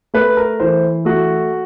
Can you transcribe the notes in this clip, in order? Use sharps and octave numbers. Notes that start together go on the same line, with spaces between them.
A3 B4
A#4
E3 C5
A3 F#4